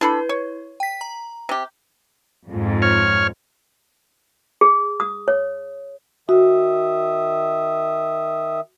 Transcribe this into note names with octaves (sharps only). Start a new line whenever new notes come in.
D4 E4 A4 B4 B5
C#5
G5 B6
A#5
C3 G4
F2 G#2
C#5 F6
G#4
D#6
C#5
D#3 F#4 E5 D#6